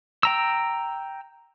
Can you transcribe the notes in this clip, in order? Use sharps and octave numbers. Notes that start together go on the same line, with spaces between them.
G5 A#5 E6